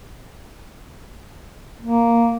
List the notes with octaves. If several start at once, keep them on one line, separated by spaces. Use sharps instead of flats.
A#3